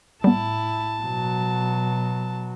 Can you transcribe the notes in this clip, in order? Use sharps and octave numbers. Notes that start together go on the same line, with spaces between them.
A2 G3 B3 E4 A5
B2 F#3